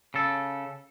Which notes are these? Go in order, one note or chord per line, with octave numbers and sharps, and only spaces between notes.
C#3 A4